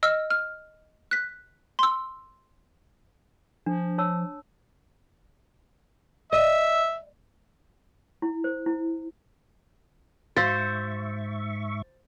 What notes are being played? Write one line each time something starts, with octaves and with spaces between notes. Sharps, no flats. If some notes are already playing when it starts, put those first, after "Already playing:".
D#5 E6 F6
F6
F#6 B6
C6 E6
F3 D4
C#5 A5 E6
D#5 E5
E4
C5
E4
G#2 F#4 C5 E5 F5 C#6 E6 A6